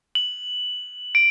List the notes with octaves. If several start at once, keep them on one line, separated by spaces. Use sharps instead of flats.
F#7
D7